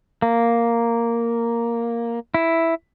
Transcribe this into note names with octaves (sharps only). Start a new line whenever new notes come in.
A#3
E4